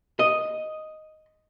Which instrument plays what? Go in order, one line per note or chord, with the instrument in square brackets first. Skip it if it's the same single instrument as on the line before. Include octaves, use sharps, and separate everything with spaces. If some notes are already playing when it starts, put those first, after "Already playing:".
[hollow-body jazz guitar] D#5